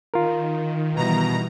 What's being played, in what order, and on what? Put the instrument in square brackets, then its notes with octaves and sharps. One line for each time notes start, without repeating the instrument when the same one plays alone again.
[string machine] D#3 [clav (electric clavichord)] F4 A#4
[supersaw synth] B2 A#5 [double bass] E3 G3